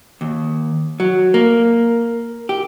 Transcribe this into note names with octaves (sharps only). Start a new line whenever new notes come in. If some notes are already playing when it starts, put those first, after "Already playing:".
D#2
F#3
A#3
G4